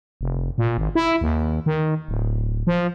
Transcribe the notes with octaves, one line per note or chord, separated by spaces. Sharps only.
F1
A#2
G#1
E4
D#2
D#3
D1
F3